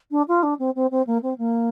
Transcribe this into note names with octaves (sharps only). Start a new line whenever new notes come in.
D4
F4
D4
C4
C4
C4
A#3
C4
A#3